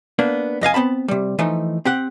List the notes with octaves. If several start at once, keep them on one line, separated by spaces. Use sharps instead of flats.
A#3 B3 D4
F2 D#5 F5 G#5
B3 C4 A5 B5
C3 G3
E3 F3 A3 D#4
C4 G4 F#5